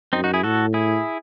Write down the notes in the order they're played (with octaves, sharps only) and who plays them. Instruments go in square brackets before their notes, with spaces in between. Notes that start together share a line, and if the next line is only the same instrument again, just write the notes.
[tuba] F#2 [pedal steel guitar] C4 D#4
[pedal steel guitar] D#4 F#4
E4 G#4
[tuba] A2 [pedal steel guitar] F#4 A4
[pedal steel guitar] E4 G#4